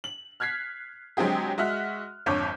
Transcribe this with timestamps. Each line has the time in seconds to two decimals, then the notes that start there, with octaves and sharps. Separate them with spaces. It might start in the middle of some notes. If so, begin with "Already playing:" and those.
0.04 F#7
0.40 F6 F#6 G#6 B6 C7
1.17 D3 F#3 G#3 C4 G4 G#4
1.58 G#3 F#4 E5 F6 F#6
2.26 G#1 F2 D3 C#5 D6 G6